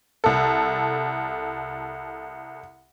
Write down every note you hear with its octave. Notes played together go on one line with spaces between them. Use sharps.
C2 A4